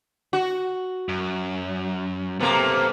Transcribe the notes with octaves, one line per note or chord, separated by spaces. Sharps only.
F#4
F#2
C3 A#3 B3 A4